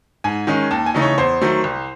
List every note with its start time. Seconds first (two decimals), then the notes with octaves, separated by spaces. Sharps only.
0.24 G#2 G#5
0.47 D#3 G#3 C#4
0.71 D#2 A5
0.86 G#5
0.94 C#3 E3 A3 D#4
1.02 C#5
1.18 E2 C5
1.41 D#3 F#3 A3
1.64 C2